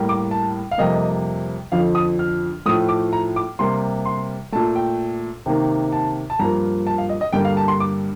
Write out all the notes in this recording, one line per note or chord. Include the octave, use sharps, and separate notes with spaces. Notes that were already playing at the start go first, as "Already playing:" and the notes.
Already playing: A2 G3 A#3
D6
A5
F5
F2 C3 G3 A#3 D#5
F2 D3 F3 F5
D#6
F6
A2 F3 A3 D#6
D6
A#5
D6
C3 G3 A#3 C6
C6
A#2 A3 A5
G5
C3 D#3 A#3
A5
A5
G2 F3 A#3 A#5
A5
F5
D#5
D#5
G2 D3 G3 A#3 G5
F5
A5
C6
D6